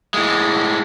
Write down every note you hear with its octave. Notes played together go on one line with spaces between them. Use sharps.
A2 G#3